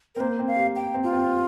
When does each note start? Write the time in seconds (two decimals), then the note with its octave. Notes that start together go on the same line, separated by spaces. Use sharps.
0.15 C4 A#4
0.20 A#3 C5
0.39 C4
0.47 F5
0.56 G4
0.76 G5
0.94 C4
1.03 F4
1.13 C4